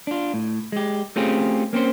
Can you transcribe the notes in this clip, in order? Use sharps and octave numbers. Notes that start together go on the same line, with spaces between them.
D4 F4
A2
G#3 G4
A3 C4 C#4 F4 G4 G#4
A#3 C4 C#4 C5